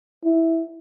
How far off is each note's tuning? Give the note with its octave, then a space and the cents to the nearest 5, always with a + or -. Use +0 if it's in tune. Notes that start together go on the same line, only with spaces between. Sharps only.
E4 -10